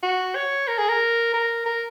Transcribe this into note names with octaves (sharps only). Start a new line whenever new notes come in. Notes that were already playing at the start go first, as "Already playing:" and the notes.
F#4
C#5
A#4
G#4
A#4
A#4
A#4